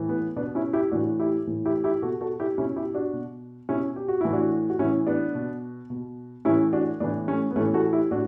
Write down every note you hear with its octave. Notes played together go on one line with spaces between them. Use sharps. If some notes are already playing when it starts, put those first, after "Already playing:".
Already playing: A2 E3
B3
B2 B3 D4
C#4 E4
E4 G4
A2 E3 D4 F#4
E4 G4
A2 E3
E4 G4
E4 G4
B2 F#4 A4
F#4 A4
E4 G4
B2 C#4 E4
E4 G4
D4 F#4
B2
B2 C#4 E4
G4
F#4
A2 E3 E4
D4 F#4
F#4
A2 E3 C#4 E4
B3 D4
B2
B2
A2 E3 C#4 E4
D4 F#4
A2 E3 B3 D4
A3 C#4
B3
A2 E3 A3 C#4
F#4 A4
E4 G4
A2 D4 F#4